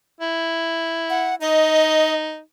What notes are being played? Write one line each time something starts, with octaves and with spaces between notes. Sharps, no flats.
E4
F#5
D#4 D#5